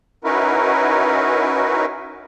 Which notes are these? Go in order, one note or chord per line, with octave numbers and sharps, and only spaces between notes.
C#4 D#4 E4 F#4 A#4 B4